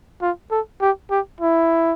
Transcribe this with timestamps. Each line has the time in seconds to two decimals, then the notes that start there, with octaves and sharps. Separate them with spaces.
0.22 F4
0.51 A4
0.81 G4
1.11 G4
1.41 E4